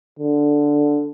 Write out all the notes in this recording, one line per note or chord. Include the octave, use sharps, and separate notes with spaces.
D3